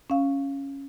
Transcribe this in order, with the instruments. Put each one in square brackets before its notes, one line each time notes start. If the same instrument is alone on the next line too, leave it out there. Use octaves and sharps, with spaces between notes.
[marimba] C#4 F5